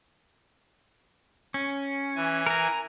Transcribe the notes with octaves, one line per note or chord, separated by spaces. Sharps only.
C#4
E3 G#5
A#4 A#5